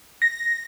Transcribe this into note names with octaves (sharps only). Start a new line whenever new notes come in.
A#6